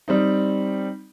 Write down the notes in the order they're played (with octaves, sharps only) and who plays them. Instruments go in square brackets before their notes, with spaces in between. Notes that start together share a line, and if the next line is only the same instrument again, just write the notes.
[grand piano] G3 C4 D#4